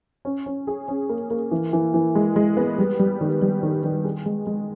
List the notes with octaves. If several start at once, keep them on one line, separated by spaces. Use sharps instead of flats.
C#4
C#4
G#4
C#4
A#3
A#3
E3
E3
E3
G#3
G#3
B3
G3
G3
D#3
G3
D#3
D#3
G#4
G#3
G#3